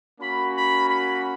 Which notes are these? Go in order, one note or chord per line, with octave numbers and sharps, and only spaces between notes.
A#3 C#4 F#4 B5
B5
B5